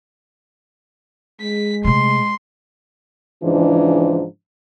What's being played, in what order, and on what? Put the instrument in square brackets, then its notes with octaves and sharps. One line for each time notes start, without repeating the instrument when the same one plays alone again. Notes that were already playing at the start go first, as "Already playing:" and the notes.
[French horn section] G#3 [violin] B6
[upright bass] C3 A3 [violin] C6
[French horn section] G#2 C#3 E3 F3 D4